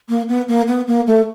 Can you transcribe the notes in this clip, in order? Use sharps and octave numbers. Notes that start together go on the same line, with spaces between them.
A#3
B3
A#3
B3
A#3
A3